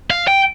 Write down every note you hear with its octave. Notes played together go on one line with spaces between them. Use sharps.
F5
G5